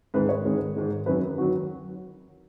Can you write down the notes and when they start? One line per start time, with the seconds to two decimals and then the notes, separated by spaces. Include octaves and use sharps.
0.14 G#2 D#3 G#3 B4
0.29 C#5
0.45 G#2 D#3 G#3
0.76 G#2 D#3 G#3
1.06 F#2 D#3 F#3 B4
1.38 D#3 F#3 F#4